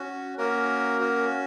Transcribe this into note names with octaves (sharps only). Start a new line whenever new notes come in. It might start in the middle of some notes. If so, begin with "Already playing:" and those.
Already playing: C#4 F#4
A#3 C#4 F#4 A#4
C#4 F#4